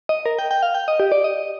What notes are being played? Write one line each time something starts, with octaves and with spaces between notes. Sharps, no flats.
D#5
A#4
G5
G5
F5
G5
D#5
G4
D5
D#5